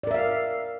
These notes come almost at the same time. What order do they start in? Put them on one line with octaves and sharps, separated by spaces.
D5 A#4 E5 F5